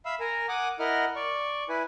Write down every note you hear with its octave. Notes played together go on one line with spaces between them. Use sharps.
E5 F5 B5 E6
A#4 G#5 A#5
F#5 G#5 D6 D#6
E4 A#4 D#5 F#5 F6
D5 C#6
E4 B4 G#5